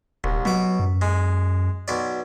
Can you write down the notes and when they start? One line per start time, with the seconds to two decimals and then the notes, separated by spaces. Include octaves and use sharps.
0.24 D#1 C2
0.45 B2 F#3 D6
0.80 F#2
1.02 G#3
1.88 B1 D5